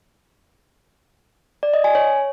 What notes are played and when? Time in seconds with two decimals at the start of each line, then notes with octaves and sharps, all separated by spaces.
1.63 D5
1.74 D#5
1.84 G#5
1.95 C#5